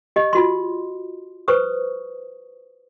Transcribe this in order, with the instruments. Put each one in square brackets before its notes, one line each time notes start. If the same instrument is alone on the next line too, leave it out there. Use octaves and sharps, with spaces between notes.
[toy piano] G4 D#5
F4 F#4 C6
B4 C5 C#6 D#6